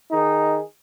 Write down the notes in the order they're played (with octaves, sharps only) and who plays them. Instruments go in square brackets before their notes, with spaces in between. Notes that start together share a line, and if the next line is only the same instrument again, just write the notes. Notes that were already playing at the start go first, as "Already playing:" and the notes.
[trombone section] D#3 D#4 G#4